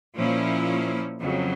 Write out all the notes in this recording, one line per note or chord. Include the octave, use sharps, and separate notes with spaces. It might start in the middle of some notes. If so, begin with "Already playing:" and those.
A#2 F3 A#3 C#4 E4
F2 C#3 F#3